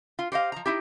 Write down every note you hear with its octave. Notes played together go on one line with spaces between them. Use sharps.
F4
G4 C5 D#5 F5
F3 A#5
D#4 E4 G4